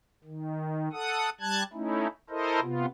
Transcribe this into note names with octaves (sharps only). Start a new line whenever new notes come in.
D#3
A4 F#5 D#6
G3 A5 F#6 G#6
A3 C#4 D#4 E4
E4 A4 A#4 C5 D#5
C3 B3 F4